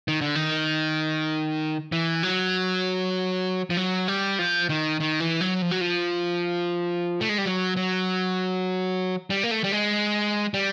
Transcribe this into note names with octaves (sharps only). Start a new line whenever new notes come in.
D#3
D3
D#3
E3
F#3
F3
F#3
G3
F3
D#3
D#3
E3
F#3
F3
F#3
F3
A3
G#3
G3
F#3
F#3
G3
A#3
A3
G3
G#3
G3